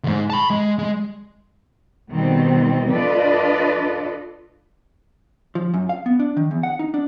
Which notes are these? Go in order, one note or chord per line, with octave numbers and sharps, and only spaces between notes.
D2 G#2
A5 B5
G#3
G#3
B2 D#3 G3 C4
D4 F4 A4 B4 D5 D#5
F3
F#2
F5
B3
D4
D#3
E2
F#5
D#4
D4